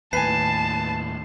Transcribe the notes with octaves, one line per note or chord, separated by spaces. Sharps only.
D#2 A2 B4 G#5 A5 C7